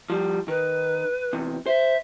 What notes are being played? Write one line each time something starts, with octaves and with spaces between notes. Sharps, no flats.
F3 G3
D#3 B4
E2 C3
C5 E5